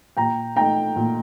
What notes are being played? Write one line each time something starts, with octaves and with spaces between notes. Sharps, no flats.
A#2 G5 A#5
A3 D#4 G5 A#5
A#2